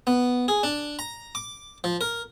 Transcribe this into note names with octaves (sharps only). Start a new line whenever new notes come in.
B3
G#4
D4
A#5
D6
F3
A#4